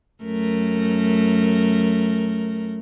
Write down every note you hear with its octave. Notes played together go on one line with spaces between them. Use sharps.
F#2 A3 A#4